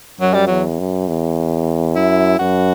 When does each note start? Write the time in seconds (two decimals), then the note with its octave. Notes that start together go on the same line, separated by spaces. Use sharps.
0.20 F#2 F#3
0.34 G3
0.47 E2 F#3
0.79 F#2
1.08 E2
1.96 F#2 E4
2.39 F#2 F#4